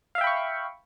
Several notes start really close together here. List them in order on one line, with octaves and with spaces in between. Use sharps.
F5 E5 G5 B5 C#6